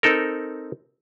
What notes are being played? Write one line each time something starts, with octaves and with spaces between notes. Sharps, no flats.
C4 D#4 A4 A#4